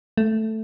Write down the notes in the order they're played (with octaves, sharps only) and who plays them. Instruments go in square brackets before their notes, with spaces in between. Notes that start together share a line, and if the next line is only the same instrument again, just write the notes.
[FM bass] A3